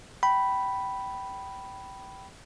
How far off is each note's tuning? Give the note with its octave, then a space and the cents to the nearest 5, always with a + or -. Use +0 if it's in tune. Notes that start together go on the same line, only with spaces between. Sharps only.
G5 -20 B5 +0